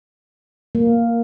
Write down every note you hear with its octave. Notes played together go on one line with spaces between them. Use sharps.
A#3